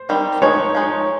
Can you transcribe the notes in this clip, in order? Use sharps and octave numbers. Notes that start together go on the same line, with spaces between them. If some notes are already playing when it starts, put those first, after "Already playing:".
Already playing: C5
D#3 G3 C4
F3 G#3 D#4 C#5
F3 G#3 D#4